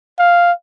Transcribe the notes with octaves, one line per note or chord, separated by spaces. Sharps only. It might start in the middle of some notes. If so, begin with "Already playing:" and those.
F5